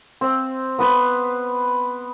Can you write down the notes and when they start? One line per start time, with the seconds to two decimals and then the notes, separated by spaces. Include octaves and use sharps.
0.21 C4
0.79 B3 B4 C5